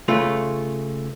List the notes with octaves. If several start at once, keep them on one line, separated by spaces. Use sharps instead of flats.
C#3 A3 F4 B4